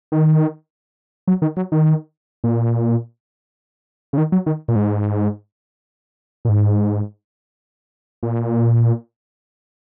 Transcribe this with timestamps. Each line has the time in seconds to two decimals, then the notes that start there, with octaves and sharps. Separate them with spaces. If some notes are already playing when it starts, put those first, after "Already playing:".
0.12 D#3
1.28 F#3
1.42 D#3
1.57 F#3
1.72 D#3
2.44 A#2
4.13 C#3
4.18 D#3
4.32 F#3
4.46 D#3
4.68 A#2
4.76 G#2
6.45 A#2
6.49 G#2
8.23 A#2